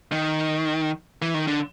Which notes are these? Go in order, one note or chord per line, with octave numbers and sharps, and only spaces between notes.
D#3
E3
D#3
D3